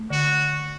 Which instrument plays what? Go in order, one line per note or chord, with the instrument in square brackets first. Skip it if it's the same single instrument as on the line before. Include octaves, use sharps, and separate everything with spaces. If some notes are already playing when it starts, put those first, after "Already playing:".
Already playing: [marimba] A3
[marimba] D3 [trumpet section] F#4